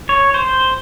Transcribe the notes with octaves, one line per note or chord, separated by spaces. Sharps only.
C#5
C5